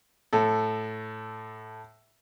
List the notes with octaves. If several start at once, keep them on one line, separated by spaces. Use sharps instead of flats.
A2 A4